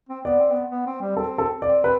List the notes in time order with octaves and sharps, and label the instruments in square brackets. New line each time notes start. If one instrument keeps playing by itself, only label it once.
[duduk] C4
[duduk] B3 [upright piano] D5
[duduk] C4
B3
B3
C4
G3
[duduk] C4 [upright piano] A4
[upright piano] A4
[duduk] C4 [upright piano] D5
[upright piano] B4